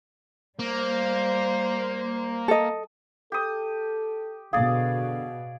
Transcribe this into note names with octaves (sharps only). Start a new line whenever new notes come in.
G3 A#3 C5
A4 D#5
G4 A4 D#6
B2 D3 G#4 D5 F5 D#6